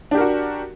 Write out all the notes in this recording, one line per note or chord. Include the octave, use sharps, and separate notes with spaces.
D4 F#4 G4 A#4